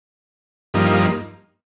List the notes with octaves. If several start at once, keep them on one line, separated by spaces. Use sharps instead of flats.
G2 F3 A#3 D#4